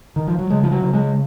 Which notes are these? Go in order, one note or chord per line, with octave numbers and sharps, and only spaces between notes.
D#3
F3
F#3
C#3 G#3
F3
F#3
C#3
G#3